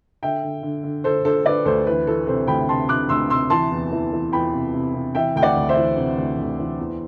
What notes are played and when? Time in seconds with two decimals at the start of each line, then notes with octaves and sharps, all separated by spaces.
0.23 D3 E5 G5
0.43 D3
0.63 D3
0.83 D3
1.04 D3 A4 C5
1.25 D3 A4 C5
1.45 D3 B4 D5
1.65 D2 A4 C5
1.87 E3 B4
2.07 E3 A4
2.27 C3 A4 C5
2.47 D2 G5 B5
2.68 C3 A5 C6
2.88 C3 D6 F#6
3.09 D2 C6 E6
3.30 C3 C6 E6
3.50 E3 A5 C6
3.71 E2
3.92 E3
4.12 E3
4.32 E2 G5 B5
4.53 C3
4.74 C3
4.94 C3
5.15 E3 E5 G5
5.36 D2 G5
5.42 D5 F#5
5.56 D2
5.69 C5 E5
5.76 E3
5.97 C3
6.18 D2
6.38 D2
6.59 E3
6.79 E2